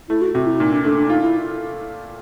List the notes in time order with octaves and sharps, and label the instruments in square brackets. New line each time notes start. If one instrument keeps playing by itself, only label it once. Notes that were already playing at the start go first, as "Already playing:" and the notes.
[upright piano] A3 [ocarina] E4
[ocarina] F#4
[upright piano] C3 [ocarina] F#4
[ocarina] E4
[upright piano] A#2 [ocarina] D#4
[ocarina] D4
[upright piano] A3 [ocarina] D4
[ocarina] D4
[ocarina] D#4 [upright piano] F4
[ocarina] E4